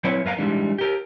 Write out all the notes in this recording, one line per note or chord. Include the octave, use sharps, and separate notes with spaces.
F#3 C4 E4 B4 C#5
F#2 A#4 B4 F5 A#5
E3 G3 G#3 D4 D#4
G4 A#4